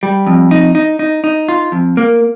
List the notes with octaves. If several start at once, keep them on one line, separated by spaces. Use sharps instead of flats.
G3
F2
D#4
D#4
D#4
D#4
F4
F2
A#3